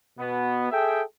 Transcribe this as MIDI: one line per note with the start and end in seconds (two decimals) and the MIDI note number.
0.19 0.67 47
0.19 0.67 59
0.71 1.01 68
0.71 1.01 69
0.71 1.01 76
0.71 1.01 79